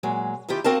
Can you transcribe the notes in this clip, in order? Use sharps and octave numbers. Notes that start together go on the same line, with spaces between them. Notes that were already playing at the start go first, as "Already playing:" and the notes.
A#2 F#3 G#3
D#3 E4 F4 G4
C4 F#4 A#4 F5 A5